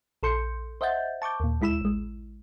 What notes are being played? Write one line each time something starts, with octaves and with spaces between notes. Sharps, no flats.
A#1 A4 C6 G6 C#7
C5 D#5 E5 F#5 G6 A6
A5 C#6 D6 G6
D#2 A#2
D2 G#3 E4 B5 E6 E7
A1 G#3